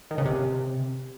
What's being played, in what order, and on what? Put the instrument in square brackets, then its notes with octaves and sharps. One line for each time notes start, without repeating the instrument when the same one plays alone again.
[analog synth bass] D#3
C#3
C3